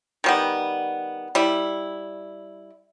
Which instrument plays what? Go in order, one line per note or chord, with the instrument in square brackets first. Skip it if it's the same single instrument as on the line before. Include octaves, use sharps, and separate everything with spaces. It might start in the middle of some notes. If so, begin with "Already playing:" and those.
[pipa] D#3 G3 B3
G3 E4